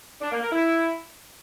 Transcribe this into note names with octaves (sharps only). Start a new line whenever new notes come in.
D4
A#3
A#4
E4